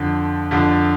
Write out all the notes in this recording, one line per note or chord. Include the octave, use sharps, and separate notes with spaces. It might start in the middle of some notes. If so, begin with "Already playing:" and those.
Already playing: F2 D3
F2 D3